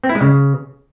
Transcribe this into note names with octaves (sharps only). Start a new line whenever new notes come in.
C4
E4
G#3
C#3